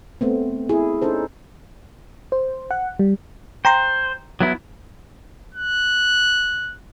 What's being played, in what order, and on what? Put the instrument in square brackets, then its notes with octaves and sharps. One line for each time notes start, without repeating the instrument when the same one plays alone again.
[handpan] A3 B3 C4
E4 G#4
C#4 D#4 A4 C5
[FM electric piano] C5
F#5
G3
[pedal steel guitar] C5 [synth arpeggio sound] G5 A#5 C6
[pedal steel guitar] F#3 B3 E4
[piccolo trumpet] F#6